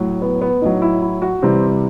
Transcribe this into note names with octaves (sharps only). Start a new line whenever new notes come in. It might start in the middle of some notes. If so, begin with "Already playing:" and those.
Already playing: A2 F#3
B3
B3
A2 F#3 D#4
E4
E4
F#4
C3 E3 G3 C4